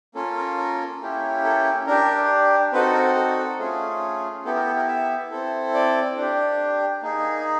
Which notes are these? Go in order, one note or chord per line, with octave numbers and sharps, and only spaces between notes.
A#3 C#4 F4 A4
A#4
A#4
A#3 C#4 E4 G4
A4
D4 G4 A#4
C4 D#4 F#4 A4 B4
A#4
A4
A3 C#4 F4 G#4
B3 E4 G4 A4
A#4
A4
A#4
E5
C4 E4 A4
D5
D4 G4
A#3 D#4 G#4